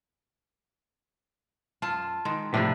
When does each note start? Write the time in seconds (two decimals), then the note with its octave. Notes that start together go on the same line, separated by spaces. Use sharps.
1.82 F#2 F4 A5
2.25 D#3 G#3
2.54 A2 C3 F3 G3 D4